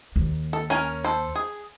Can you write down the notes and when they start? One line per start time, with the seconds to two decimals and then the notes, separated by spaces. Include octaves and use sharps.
0.16 D#2
0.53 A4
0.70 C#4 A#4 G#5
1.04 A4 C5
1.35 G#4